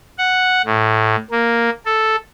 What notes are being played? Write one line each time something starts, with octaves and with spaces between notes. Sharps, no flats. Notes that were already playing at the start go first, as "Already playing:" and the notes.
F#5
A2
A#3
A4